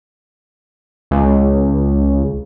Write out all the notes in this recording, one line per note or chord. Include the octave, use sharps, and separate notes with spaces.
C#2